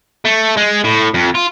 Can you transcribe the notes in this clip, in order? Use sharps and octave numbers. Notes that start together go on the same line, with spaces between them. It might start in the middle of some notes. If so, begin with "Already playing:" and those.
A3
G#3
A2
F2
F4